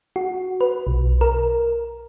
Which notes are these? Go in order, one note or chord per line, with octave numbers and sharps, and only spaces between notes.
F#4
B4
B1
A#4